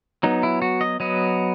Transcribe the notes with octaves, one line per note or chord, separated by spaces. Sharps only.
F#3 B3 D#4
E4
F#4
D#5
F#3 B3 D#5